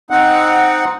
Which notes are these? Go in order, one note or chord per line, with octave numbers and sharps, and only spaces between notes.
C4 D#4 F#5